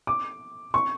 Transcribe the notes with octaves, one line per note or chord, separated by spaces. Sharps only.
D6
C#6